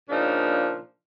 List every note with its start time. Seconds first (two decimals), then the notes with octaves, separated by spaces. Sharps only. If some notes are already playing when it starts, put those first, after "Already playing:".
0.10 A#2 C#3 F3 D4 D#4